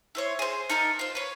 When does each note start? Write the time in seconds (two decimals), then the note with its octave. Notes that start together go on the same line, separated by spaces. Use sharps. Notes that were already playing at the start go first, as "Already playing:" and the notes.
0.15 E4 C5 C#5
0.39 G#4 C5
0.69 D#4 A4 A#4 D5
0.99 F4 C5
1.15 B4 C#5